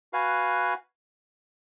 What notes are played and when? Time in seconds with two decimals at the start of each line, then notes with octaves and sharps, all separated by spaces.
0.13 F#4 B4 F5 G#5